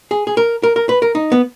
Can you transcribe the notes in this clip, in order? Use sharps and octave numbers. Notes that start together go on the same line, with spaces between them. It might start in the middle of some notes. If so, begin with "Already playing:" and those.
G#4
G#4
A#4
A#4
A#4
B4
A#4
D#4
B3